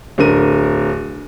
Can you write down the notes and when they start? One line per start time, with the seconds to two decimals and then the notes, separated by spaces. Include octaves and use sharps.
0.18 D1 D3 A#4 D#7